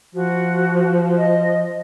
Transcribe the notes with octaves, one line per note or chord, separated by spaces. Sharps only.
F3 F#4
D#5